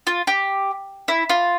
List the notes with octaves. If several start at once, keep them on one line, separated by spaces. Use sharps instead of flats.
F4
G4
E4
F4